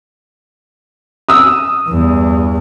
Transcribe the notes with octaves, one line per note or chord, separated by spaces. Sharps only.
D#6 E6
E2 G2